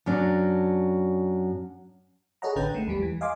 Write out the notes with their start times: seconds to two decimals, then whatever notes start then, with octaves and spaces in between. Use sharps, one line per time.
0.06 F#2 F#3 D4
2.42 G#4 A4 C#5 D#5 F#5 A#5
2.56 A1 D3 C#4 B4 G5 A#5
2.74 G#3 A3
2.88 E2 G3 G4
3.02 E3
3.21 D#5 F5 G#5 C6 D6